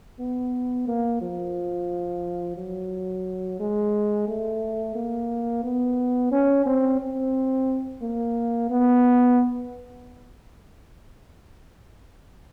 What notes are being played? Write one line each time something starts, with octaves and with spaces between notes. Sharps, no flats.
B3
A#3
F3
F#3
G#3
A3
A#3
B3
C#4
C4
C4
A#3
B3